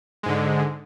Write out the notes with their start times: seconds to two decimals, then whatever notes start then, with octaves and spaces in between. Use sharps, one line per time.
0.23 G#3
0.26 G#2
0.28 D3